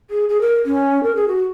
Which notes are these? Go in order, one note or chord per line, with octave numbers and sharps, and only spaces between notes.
G#4
G#4
A#4
C#4
A#4
G#4
F#4